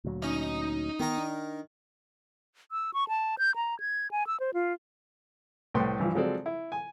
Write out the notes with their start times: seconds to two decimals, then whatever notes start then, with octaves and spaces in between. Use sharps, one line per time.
0.05 D2 A#2 F#3
0.22 C#4 D#4 D#5
1.00 D#3 B3 A#4
1.18 D4
2.72 E6
2.94 C#6
3.08 A5
3.38 G6
3.56 A#5
3.80 G#6
4.11 G#5
4.27 E6
4.40 C5
4.54 F4
5.74 C2 A2 B4 G5 C6
5.99 G2 E3 F3
6.15 F3 F#3 G#3 C4 A4 D5
6.46 E4
6.72 G#5